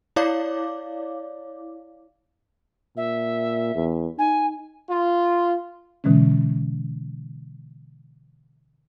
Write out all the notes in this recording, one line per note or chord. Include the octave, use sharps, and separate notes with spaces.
E4 C#5 D5 F5 D6
A#2 E5
E2
D#4 G#5
F4
B2 D3 E3 G#3 C#4